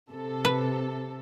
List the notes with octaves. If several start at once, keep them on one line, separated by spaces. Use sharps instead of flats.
C3 A4
B4